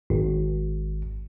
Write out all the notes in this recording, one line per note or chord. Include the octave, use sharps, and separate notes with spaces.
G#1